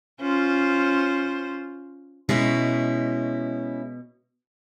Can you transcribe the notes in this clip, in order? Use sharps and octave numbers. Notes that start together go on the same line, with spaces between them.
C#4 F4 C5
B2 G#3 C#4 E4